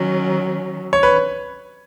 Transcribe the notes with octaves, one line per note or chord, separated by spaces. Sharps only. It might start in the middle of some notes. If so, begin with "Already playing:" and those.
Already playing: D#3 F#3 C#4
C#5
B4